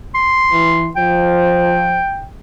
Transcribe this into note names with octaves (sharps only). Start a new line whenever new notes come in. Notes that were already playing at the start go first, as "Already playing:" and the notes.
C6
E3
F3 G5